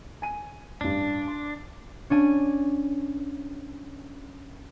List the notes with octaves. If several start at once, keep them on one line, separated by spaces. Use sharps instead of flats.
G#5 D#7
A1 G2 D4
C6
C#4 D4 G#5